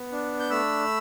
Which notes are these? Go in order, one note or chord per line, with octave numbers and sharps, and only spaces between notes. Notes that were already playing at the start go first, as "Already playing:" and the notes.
Already playing: B3
D4
G6
A3 B5 E6